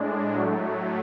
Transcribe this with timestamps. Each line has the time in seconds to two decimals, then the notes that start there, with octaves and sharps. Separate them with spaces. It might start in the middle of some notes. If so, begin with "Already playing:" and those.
Already playing: A2 G#3 D4
0.33 A2 F#3 A3